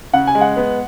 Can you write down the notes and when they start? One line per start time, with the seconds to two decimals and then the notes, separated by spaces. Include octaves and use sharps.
0.13 C#3 F#5
0.27 G#5
0.35 G#3
0.41 F#5
0.57 B3